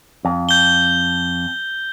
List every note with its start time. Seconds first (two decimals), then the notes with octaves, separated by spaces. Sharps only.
0.25 F2
0.49 G6 G7